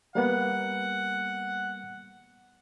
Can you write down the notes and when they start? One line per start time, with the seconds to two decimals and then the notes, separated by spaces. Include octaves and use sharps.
0.15 G3 A#3 B3 F#5